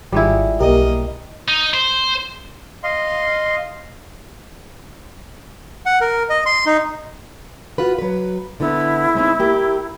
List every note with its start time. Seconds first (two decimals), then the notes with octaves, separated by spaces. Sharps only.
0.12 G#1 G3 G#3 E4 F4
0.60 B1 A#3 G4 A#4 D#5
1.48 D#4
1.74 C5
2.84 D#5 F5 C6
5.86 F#5
6.01 A#4
6.30 D#5
6.46 C6
6.66 D#4
7.78 F4 F#4 B4
7.98 F#3 B4
8.60 D3 B3 E4
9.15 G#3 C4 D#4
9.40 A#3 G4